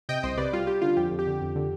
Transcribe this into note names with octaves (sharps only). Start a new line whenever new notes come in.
C3 D#5 G5
C2 C5 D#5
C3 B4 D5
G3 F4
G3 G4
D3 F4
F2 G4
F2
G4
D3
F2
D3